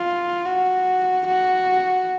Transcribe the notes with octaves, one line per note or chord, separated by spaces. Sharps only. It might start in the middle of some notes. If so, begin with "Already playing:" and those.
Already playing: F4
F#4
F#4